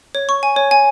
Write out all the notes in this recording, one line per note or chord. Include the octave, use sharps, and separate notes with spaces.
C#5
C#6
G#5
C#5
G#5